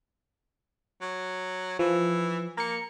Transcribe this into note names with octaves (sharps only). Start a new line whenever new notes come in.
F#3
E3 F3
A#3 A#5 C#7